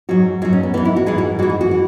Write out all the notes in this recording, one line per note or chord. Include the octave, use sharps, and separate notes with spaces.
G#2 F#3 F#4
G#2 F#3 F#4
C#4
B3
G#2 E3 B3
E4
F#4
G#2 E3 G#4
F#4
G#2 E3 F#4
G#4
F#4
E3